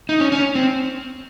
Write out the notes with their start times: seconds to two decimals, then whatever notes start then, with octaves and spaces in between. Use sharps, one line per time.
0.09 D#4
0.20 C#4
0.32 C#4
0.55 C4